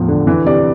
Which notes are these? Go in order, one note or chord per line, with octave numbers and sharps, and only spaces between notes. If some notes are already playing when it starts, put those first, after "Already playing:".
Already playing: E2 A2 F3
D3
E3
C3 D5